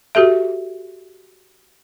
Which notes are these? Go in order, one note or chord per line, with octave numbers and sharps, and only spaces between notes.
F#4 G4 A4 E5